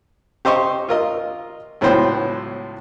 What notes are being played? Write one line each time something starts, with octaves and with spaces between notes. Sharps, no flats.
G4 C5 D#5 C6 C#6
F4 A#4 D#5
C#2 A2 F#3 B3 C5 G5